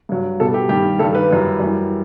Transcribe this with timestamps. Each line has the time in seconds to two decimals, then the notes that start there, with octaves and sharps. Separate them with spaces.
0.09 G2 F#3
0.40 B2 G3 A4
0.54 G4
0.69 G2 D#3 G3 G4
0.99 G2 D#3 G3 A4
1.15 B4
1.31 F#2 E3 G3
1.60 F#2 E3 G3